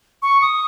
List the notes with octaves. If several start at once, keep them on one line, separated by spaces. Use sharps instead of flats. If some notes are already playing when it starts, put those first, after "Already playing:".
C#6
D#6